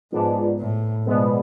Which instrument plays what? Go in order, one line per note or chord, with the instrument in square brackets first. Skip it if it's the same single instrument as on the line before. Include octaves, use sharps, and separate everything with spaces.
[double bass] G#2 [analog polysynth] F3 G#3 B3 D4
[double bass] A2
[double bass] B2 [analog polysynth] F3 G#3 B3 D4